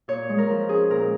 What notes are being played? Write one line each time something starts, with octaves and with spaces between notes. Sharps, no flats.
A#2 C#5
G#3
A#4
F3
C#4 G#4
A#2 A#4